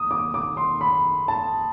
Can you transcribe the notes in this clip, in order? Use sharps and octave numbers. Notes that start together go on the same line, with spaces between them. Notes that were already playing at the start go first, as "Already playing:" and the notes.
Already playing: D#6
D6
D6
C6
B5
A5